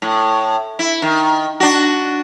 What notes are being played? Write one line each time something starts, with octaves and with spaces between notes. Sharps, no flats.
A2
E4
D#3
D4 F#4